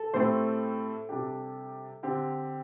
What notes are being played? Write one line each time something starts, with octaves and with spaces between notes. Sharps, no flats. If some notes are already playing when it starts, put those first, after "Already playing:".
Already playing: A4
A2 A3 C4 G4 C5
C3 G3 D4 G4
D3 C4 G4